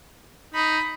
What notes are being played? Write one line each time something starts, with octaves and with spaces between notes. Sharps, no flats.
D#4 B5